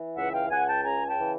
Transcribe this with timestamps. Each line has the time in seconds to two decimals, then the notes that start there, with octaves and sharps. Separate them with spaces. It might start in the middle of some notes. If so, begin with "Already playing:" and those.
Already playing: E3
0.16 C#2 E5 F#5
0.33 F5 G5
0.50 C#2 F#5 G#5
0.67 G5 A5
0.84 C#3 G#5 A#5
1.07 G5 A5
1.19 E3